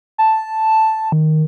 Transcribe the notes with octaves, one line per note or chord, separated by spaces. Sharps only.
A5
D#3